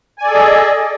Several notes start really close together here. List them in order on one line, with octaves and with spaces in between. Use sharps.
G#5 D5 A4 G#4 D#5